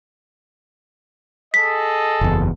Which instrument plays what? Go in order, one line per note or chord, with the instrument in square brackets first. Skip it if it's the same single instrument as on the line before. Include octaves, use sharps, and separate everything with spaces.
[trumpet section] G#4 A4 D#5 [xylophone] B6
[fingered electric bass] F#1 E2